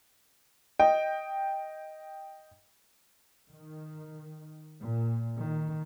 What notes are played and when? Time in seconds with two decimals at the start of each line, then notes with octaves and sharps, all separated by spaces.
0.80 D#5 G5
3.51 D#3
4.80 A#2
5.42 D#3